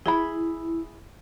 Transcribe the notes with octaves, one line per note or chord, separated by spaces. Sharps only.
E4 G#4 E5 B5